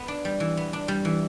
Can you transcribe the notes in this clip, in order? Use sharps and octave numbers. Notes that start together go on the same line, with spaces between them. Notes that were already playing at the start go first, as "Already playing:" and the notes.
Already playing: B3
D4
G3
E3
B3
D4
G3
E3